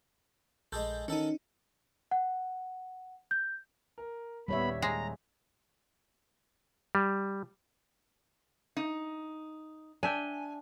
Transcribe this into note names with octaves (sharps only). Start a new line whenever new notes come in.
A#1 G#3 G#4 A4 G6
D#3 C#4 D#4 A4
F#5
G6
A#4
D#1 G3 B3 C#5 E5 B5
G#3 A#5
G3
D#4
D4 E5 G5 G#5